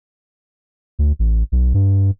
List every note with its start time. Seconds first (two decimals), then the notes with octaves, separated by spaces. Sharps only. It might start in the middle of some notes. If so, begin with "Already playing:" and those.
0.99 D2
1.19 A1
1.52 B1
1.74 G2